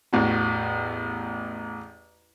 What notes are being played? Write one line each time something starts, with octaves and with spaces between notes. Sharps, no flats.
A1 E2 F#4